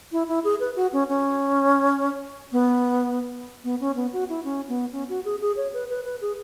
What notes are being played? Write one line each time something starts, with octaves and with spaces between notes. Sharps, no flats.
E4
E4
G#4
B4
F#4
C#4
C#4
B3
B3
C#4
B3
F#4
E4
C#4
B3
C#4
F#4
G#4
G#4
C#5
B4
B4
B4
G#4